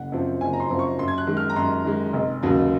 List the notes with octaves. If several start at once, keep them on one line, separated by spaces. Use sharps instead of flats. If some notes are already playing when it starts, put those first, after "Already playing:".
Already playing: F#1 F#5
F#2 F3 C4
F#1 G#5
A#5
C6
F#2 F3 C4
C#6
F#2 C6
G#6
F#6
D#3 G#3
F6
A#5
F#2 C6
D#3 G#3
F1
D#2 C#3 F#3